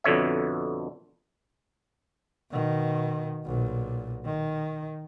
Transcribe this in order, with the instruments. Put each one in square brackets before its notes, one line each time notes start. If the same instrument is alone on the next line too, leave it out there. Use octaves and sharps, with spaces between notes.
[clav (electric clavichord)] F2 B2 D3 C#5 E5
[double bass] B2 D#3
B1 A#2
D#3